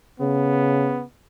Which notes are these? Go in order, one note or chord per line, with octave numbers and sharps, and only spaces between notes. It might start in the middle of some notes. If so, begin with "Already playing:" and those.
C#3 B3